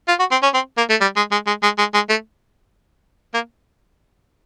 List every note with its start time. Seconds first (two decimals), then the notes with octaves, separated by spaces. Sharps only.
0.08 F4
0.19 F#4
0.31 C4
0.43 C#4
0.54 C4
0.77 A#3
0.90 A3
1.01 G3
1.16 G#3
1.32 G#3
1.47 G#3
1.63 G#3
1.78 G#3
1.94 G#3
2.10 A3
3.34 A#3